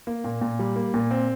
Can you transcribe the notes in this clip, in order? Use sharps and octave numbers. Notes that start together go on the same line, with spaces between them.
A#3
A#2
A#2
G3
A#3
A#2
C4